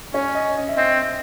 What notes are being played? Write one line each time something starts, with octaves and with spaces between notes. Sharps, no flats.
C#4 C#5
D#5
D#5
E5
C4 D#5